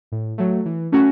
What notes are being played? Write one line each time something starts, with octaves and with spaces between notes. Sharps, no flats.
A2
F#3 A3
E3
A3 C#4 F#4